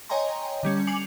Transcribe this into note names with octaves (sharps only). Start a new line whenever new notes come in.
C#5 D#5 G5 G#5 A#5 C6
D3 G3 C#4
G#5 D6 C7 C#7 F7 F#7